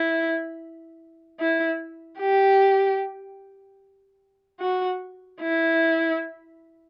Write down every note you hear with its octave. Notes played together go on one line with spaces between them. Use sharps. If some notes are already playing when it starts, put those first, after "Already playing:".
Already playing: E4
E4
G4
F#4
E4